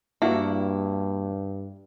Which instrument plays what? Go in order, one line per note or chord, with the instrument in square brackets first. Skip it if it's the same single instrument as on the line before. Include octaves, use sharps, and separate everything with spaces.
[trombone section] G2 [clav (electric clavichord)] A#3 D4 F#4 [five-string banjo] E4